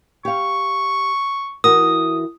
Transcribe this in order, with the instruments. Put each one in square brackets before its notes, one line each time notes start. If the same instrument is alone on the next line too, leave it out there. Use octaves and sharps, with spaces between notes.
[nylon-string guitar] G4 F5 [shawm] C#6
[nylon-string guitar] E3 F#4 A#4 [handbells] D#6